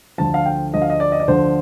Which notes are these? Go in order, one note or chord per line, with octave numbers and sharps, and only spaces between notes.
D2 D3 F3 A5
F5
G5
D2 D3 F3 D#5
F5
D#5
D5
D#5
D5
D2 D3 F3 C5